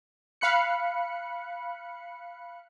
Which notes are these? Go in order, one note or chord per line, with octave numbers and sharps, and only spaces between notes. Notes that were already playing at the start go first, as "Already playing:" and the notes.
F5 B5 F#6 C#7